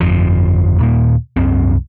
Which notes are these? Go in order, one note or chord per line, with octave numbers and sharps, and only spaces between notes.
G1 F2 F3
D#2 A#2 A#3
C2 F#2 C4